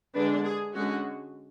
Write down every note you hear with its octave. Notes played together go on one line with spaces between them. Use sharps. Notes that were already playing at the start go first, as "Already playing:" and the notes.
D3 G#3 D4 B4
G#4
D3 G#3 C#4 F#4